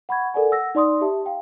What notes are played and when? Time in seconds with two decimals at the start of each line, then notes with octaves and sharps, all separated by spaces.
0.09 F#5 B5 C#6 G#6
0.34 A4 A#4 D5 F#5 G#5
0.51 F#5 E6 A#6
0.75 D#4 D5 C6 D#6
1.01 G4 E5 A5
1.26 F5 G5